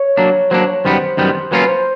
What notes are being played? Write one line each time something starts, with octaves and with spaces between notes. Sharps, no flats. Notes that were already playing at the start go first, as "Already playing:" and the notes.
Already playing: C#5
F#3 A#3 D4
F#3 A#3 D4 C5
C#5
F#2 D#3 G3 B3 C5
F#2 D#3 G3 B3
F#3 A#3 C#4 F4 B4
C5